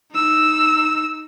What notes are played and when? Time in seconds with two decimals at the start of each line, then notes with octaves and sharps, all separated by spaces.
0.13 D#4 E6